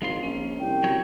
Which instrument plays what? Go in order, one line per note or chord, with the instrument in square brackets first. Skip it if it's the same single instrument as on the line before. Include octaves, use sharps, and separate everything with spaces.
[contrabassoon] G#1 [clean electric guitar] G#3 F4 C6
[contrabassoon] A#1 [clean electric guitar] C#4
[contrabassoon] C2 [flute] G5
[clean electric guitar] F#3 C#5